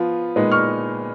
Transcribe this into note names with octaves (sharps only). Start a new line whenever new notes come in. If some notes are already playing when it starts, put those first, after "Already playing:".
Already playing: F3 B3 F4
A#2 G#3 B3 D#4
C#6 F6